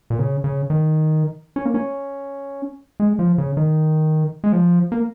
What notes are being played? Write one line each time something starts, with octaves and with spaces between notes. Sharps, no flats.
A#2
C#3
C#3
D#3
C#4
A#3
C#4
G#3
F3
C#3
D#3
G#3
F3
A#3